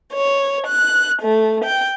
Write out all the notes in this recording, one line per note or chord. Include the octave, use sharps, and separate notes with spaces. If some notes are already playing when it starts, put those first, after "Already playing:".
C#5
F#6
A3
G5